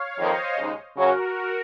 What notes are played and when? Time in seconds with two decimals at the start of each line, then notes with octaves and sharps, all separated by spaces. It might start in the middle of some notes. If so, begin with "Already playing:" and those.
Already playing: C#5 F5
0.18 F2 D#3 A#3 C5 D#5
0.57 D#2 C#3 G#3 D#4
0.96 F#2 C#3 F#3 C#4 F#4 A#4